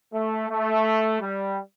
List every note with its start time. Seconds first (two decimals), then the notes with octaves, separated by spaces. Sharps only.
0.13 A3
0.50 A3
1.21 G3